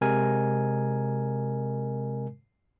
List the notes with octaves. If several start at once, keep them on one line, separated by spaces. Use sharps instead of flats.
C3 G#3 A#4 D#5 G#5